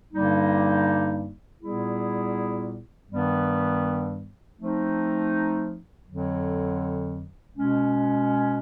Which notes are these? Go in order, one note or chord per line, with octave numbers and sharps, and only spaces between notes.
G2 D3 G3 A#3 D#4
A#2 G3 B3 E4 G#4
G2 D#3 G3 B3
F3 A3 C4 D#4
F2 D3 F#3
B2 G#3 C#4